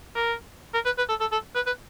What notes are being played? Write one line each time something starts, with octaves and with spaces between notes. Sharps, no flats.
A#4
A#4
B4
B4
A4
A4
A4
B4
B4